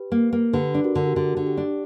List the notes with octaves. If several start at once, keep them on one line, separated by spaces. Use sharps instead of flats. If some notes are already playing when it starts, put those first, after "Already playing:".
Already playing: G4 B4
A#3
A#3
D3 G4 B4
D4
F#4 A#4
D3 A#4
G4
D3 F#4
D3
G4
D4